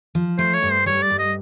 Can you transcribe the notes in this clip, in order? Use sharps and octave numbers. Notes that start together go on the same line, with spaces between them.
F3
A3 C5
C#5
G2
C5
G3 C#5
D5
G2
D#5